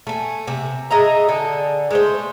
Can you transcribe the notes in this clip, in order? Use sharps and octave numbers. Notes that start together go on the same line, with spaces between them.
A3 G#5
C3 E5
G#4 D#5 E5 A#5
D3 A4 G#5
G#3 A3 C5